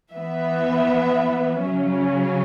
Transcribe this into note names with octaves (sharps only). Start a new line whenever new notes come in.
E3 B3 E5
C#3 F#3 C#4